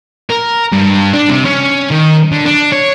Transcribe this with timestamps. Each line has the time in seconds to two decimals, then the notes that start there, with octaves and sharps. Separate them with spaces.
0.29 A#4
0.72 G2
1.14 D4
1.30 C3
1.45 C#4
1.91 D#3
2.32 D3
2.45 D4
2.72 C#5